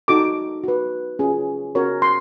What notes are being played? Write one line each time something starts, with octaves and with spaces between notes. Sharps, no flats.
D#4 F#4 A4 D6
F#4 B4
C#4 F4 G#4
C#4 F#4 A#4 C#5
C6